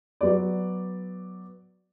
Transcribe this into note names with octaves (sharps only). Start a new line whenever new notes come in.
F#3 B3 D5